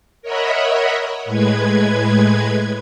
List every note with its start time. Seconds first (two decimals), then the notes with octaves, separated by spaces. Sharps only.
0.22 A#4 C#5 D#5 E5 F#5 B5
1.25 A2 G#3 B4 G#6